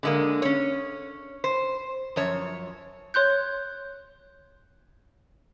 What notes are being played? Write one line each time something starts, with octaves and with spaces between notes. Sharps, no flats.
D3 G#3 A#3
C#4 C#5
C5
F#2 F3 C#5
C#5 C6 F#6 G6